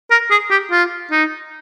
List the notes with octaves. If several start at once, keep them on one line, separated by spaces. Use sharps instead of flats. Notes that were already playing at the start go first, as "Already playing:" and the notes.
A#4
G#4
G4
F4
D#4